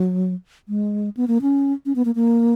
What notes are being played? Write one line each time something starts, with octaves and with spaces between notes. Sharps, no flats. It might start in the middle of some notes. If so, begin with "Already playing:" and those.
Already playing: F#3
G#3
B3
A#3
C#4
C#4
B3
A#3
A#3